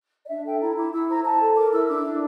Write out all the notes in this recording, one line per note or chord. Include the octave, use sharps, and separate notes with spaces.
D5
D4 E5
A4 G5
E4 A#5
E4 D6
E4 E6
C5 A#5
C5 A5
A4
A#4 D6
E4 E6
D4 D6
D4